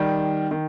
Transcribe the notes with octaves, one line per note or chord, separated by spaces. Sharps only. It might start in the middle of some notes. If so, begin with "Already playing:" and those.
Already playing: D#3 G3
D#3